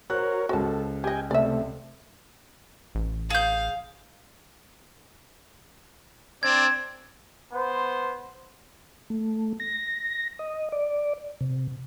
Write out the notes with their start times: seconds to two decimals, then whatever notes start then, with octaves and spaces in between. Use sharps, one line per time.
0.10 F#4 A#4 C5 C#5 F#6
0.49 C#2 F#4 A4 C5 A5
1.04 G4 D#5 G5 G#5
1.31 C3 A3 D5 E5
2.95 A1
3.30 G#4 F5 G6
6.43 C4 D4 D5 G#6
7.53 B3 C5
9.10 A3
9.60 A#6
10.39 D#5
10.72 D5
11.41 C3